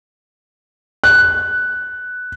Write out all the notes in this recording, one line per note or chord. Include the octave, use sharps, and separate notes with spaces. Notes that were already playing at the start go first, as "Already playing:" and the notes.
F#6